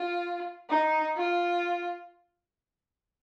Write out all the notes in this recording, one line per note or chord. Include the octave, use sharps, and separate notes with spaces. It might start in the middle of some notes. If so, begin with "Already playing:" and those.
Already playing: F4
D#4
F4